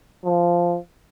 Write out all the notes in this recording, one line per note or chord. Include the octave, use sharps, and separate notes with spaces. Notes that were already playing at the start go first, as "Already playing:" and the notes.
F3